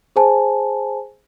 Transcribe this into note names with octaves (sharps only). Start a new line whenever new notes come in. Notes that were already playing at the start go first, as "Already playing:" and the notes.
G#4 C5 G#5 A5